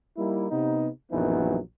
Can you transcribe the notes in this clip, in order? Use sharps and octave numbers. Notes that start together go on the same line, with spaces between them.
G3 A#3 D#4 E4
C3 B3 D#4
A#1 F#2 E3 F#3 B3 D#4